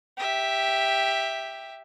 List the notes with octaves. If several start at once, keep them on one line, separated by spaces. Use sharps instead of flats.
G4 E5